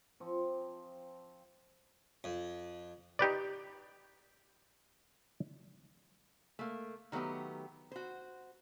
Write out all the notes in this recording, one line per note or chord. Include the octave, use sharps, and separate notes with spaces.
F3 C4 G#5 C#6
F2
D#4 G4 B4 D5
A3 A#3
D#3 F#3 A3 B3 G4
F#4 C5